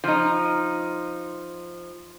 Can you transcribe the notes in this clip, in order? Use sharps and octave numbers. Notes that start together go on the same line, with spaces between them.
F3 D#4